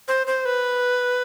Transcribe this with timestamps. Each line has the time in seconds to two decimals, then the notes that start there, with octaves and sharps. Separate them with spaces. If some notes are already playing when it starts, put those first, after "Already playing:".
0.08 C5
0.27 C5
0.45 B4